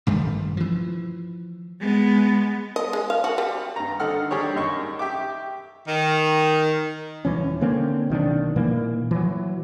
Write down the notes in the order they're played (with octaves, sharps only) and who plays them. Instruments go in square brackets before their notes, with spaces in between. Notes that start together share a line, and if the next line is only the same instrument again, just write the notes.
[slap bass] A1 G2 D#3 A3
E3 F3
[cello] G#3 B3
[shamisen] D#5
G#3
F5
F#4
G3
[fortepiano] G2 A#5
D3 D#4 A4 F#5 F6
D3 G3 G4 G#4 C#5
F#2 D#4 C#6
G4 E5 D6
[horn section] D#3
[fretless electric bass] D#1 E3 C#4
D3 A#3 C4 C#4
B1 D#3 F3 D4
A#2 E3 A#3
E3 F#3